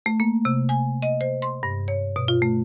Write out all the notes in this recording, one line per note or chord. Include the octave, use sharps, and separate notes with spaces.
A3
A#3
C3
G#5
D#5
C5
C6
G2
C#5
B2
F4
A3